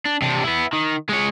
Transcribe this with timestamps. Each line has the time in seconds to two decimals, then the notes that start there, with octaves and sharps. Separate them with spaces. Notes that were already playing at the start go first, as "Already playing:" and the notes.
0.06 D4
0.22 C3 D4
0.44 B3 E4
0.73 D#3
1.09 G#3 C#5